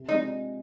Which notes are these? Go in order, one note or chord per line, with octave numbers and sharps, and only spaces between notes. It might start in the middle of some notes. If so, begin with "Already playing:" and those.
Already playing: C3
G#3 C4 D#4 F4 G#4